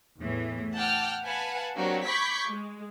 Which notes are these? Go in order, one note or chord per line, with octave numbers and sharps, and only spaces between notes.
E2 A2 E3
F#5 G5 A5 D6 F6
B4 F5 F#5 G#5 A5 B5
F#3 A#3 C4 D4 F#4 G4
B5 C#6 D6 G6 G#6 B6
G#3